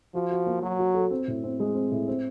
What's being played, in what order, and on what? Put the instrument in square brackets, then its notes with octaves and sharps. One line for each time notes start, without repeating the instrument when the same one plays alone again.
[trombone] F3 [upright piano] F#4
[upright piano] F#4
A#3
[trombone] F#3 [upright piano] F#4
[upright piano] F#4
A4
C4
A2
C4
G#3
C4
A2
C4